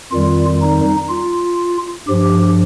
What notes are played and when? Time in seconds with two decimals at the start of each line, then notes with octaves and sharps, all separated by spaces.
0.12 F2 D#3 G3 F4
0.62 D#4
1.10 F4
2.08 G2 F3 G4